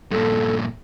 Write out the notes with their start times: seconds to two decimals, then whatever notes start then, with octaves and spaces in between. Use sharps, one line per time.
0.11 G2 A#2 A4